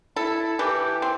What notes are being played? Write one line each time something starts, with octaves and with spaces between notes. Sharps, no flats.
E4 A4
E3 G4
C4